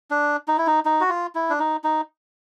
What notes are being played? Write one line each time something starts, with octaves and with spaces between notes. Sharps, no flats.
D4
D#4
E4
D#4
D#4
F#4
F4
E4
D4
D#4
D#4